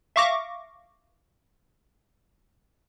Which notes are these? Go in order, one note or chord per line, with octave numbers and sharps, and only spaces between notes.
E5 F5 C#6 D6 A#6